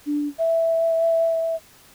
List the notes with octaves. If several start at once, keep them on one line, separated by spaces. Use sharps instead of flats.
D4
E5